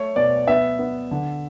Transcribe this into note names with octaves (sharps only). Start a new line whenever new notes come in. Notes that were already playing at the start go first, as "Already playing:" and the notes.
Already playing: A3 C#5
B2 D5
B3 E5
B3
D3